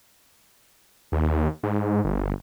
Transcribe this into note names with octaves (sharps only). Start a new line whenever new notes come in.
D#2
G#2
G1